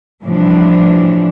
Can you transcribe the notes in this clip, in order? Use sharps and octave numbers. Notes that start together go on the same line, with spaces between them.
A2 C3 E3 F3 G3 D4